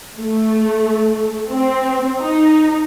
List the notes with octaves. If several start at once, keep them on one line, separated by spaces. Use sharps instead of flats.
A3
C4
D#4